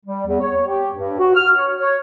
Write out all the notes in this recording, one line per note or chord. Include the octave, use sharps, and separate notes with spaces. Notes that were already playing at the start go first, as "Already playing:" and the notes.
G3
E2
C#5
G4
G2
F#4
F6
C#5
C#5